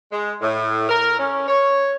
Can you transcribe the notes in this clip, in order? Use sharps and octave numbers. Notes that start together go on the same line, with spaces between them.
G#3
A2
A#4
C#4
C#5